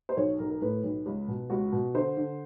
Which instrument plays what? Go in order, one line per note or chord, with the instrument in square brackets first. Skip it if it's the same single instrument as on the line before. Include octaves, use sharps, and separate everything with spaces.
[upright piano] C5
B1 C#5
B1 A#4
A#4
A2 B4
B1
C#2
B2
C#2 F#4
B2
D3 C5
D3